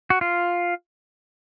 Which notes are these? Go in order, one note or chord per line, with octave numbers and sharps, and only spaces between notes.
F#4
F4